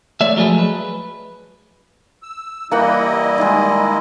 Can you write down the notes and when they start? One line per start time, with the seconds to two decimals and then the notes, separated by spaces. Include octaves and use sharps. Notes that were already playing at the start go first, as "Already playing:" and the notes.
0.21 A3 C#5 D5 E5
0.36 F3 F#3 G#3 A3 G#4 B4
0.59 B4
2.23 E6
2.71 E3 G3 A#3 E4 D#5 F#5 G5
3.38 D#3 G#3